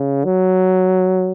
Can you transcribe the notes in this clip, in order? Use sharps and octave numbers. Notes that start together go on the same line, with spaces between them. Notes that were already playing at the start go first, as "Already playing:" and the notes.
Already playing: C#3
F#3